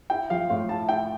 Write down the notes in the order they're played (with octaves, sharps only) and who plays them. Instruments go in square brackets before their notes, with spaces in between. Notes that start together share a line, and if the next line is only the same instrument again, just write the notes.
[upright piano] E4 [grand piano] G5
[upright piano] F3 [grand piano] F5
[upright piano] A2 [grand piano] F5
[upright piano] E4 [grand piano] A5
[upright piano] E4 [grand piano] G5